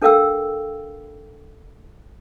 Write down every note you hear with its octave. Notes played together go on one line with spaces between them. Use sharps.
D4 A4 A#4 F5 G5 E6